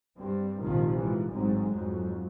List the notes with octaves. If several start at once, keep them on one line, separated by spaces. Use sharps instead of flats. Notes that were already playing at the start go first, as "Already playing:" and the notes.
G2 C4
A#1 G#2 C3 D#3 F3
G#2 E3 F3
A1 G#2 F#3 G#3 C4
F2 G#2 F#3